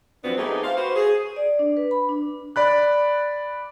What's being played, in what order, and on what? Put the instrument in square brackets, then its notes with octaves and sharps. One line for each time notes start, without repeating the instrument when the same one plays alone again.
[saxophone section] F#2 F3 B3 C4 D4
A3 B3 D#4 G4 G#4
C5 F5
F#4 B4 C5
G#4
[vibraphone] D5
D4
B4
B5
D4
[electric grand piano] D5 B5 F#6